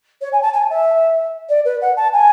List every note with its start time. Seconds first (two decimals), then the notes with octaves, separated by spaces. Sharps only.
0.21 C#5
0.32 G#5
0.42 A5
0.53 G#5
0.69 E5
1.49 D5
1.65 B4
1.81 F#5
1.96 A5
2.13 G#5